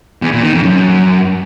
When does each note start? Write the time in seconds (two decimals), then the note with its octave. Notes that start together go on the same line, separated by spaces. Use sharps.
0.22 E2
0.32 A#2
0.42 D#3
0.53 F2
0.63 F#2